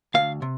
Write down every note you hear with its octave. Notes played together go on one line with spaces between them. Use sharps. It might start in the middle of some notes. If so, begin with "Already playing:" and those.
D2 F5
C3